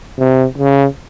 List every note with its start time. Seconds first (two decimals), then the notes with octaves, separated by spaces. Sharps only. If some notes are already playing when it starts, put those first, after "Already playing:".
0.18 C3
0.58 C#3